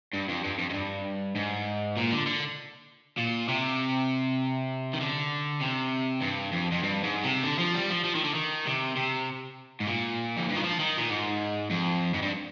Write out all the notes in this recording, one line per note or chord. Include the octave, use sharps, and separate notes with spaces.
G2
F2
G2
F2
F2
G2
G#2
A#2
D3
D3
A#2
C3
D#3
D3
C3
G2
F2
F2
G2
G#2
C3
D3
F3
G3
F3
F3
D#3
D3
D#3
C3
C3
G#2
A#2
F2
G2
D#3
F3
D#3
A#2
G#2
F2
G#2
G2